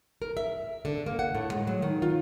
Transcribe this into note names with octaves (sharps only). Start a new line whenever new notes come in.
A#4
E5
D3
A#3
F#5
A2
G#3
F#3
D#3
F4